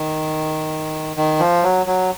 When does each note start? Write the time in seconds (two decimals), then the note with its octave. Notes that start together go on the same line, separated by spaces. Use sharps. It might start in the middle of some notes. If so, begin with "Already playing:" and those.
Already playing: D#3
1.17 D#3
1.40 F3
1.63 F#3
1.86 F#3